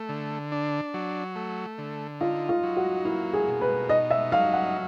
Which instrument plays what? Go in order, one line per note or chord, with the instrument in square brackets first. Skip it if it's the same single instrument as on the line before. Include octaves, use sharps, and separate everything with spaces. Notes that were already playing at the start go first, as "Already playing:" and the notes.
Already playing: [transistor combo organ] A3
D3
D4
F#3
A3
D3
[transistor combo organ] D#4 [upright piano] F4
[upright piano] F4
[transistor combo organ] F#3
[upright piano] F#4
[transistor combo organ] A#3 [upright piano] E4
[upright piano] G#4
[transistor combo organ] B2
[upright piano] B4
[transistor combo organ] D#4 [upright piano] D#5
[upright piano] E5
[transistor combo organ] F#3 [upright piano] F5
[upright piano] F#5